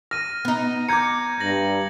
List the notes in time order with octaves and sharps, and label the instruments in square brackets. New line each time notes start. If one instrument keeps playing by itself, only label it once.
[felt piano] F6 [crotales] A#6 D#7
[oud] B3 D#4
[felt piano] A#5 D6 [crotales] G6 G#6 C#7
[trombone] G2 [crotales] A#6 F#7